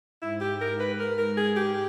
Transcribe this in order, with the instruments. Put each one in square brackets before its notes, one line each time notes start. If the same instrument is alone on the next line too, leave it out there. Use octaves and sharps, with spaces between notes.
[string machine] G#2 [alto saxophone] E4
[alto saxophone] G4
[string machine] G#2 [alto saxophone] A#4
[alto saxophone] B4
[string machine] G#2 [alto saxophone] A#4
[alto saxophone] A#4
[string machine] G#2 [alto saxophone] G#4
[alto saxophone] G4